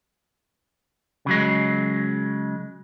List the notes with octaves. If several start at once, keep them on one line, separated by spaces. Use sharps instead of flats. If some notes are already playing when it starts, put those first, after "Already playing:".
C#3 F#3 G#3